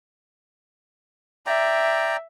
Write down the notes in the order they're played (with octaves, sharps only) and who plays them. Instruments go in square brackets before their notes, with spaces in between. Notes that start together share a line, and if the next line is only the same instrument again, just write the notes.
[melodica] D5 G5 A#5 [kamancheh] E5